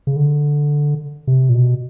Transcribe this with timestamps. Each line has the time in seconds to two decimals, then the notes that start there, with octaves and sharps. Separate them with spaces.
0.07 C#3
0.16 D3
1.27 C3
1.49 A#2
1.55 B2